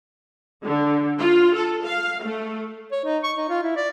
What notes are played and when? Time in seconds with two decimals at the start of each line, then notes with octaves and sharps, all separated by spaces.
0.64 D3
1.19 F4
1.55 A4
1.85 F5
2.26 A3
2.92 C#5
3.04 D#4
3.23 C#6
3.37 D#4
3.49 F4
3.63 E4
3.76 D5